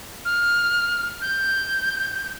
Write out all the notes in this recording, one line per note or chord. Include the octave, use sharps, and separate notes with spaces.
F6
G6